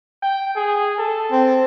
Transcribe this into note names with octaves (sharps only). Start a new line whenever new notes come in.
G5
G#4
A4
C4